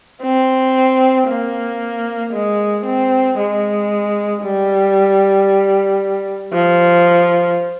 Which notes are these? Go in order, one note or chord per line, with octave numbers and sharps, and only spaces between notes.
C4
A#3
G#3
C4
G#3
G3
F3